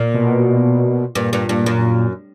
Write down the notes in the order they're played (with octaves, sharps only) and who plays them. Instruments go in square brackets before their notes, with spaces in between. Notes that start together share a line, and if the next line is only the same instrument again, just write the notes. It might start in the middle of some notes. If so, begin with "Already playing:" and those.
Already playing: [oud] A#2
[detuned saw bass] B2
[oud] G2 [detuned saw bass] A#2
[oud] G2
G2
F#2